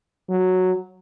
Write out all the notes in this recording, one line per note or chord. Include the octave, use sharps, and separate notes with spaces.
F#3